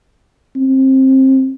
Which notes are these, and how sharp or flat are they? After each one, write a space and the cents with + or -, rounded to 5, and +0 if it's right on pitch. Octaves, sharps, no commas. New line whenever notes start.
C4 +20